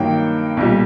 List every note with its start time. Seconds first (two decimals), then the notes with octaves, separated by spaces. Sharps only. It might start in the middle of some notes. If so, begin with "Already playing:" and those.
Already playing: G2 D#3 F#3 A#3 G5
0.57 B1 A#2 G3